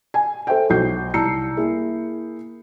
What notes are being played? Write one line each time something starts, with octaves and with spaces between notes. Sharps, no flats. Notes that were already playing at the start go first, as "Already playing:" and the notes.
G#5
A4 C5 E5 G5
B1 F#4 G6 C7
C2 A5 A#5 E6 C7 C#7
A#3 E4 G#4